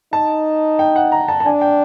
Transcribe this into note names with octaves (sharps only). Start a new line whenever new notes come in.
D#4 A5
G5
F#5
A#5
A5
A5
D4 G#5
G5